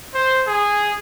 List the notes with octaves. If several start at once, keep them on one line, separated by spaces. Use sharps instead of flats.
C5
G#4